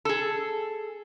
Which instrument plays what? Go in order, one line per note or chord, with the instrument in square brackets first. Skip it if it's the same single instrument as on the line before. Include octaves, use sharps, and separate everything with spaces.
[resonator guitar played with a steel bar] G#4 A4